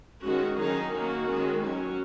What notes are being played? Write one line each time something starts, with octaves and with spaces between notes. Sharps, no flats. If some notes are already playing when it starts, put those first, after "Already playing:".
D#3 G#3 C#4 F#4
D#3 F#3 C#4 D#4 G#4
D#3 A#3 C#4 F#4
D#3 G#3 C#4
F#3 C#4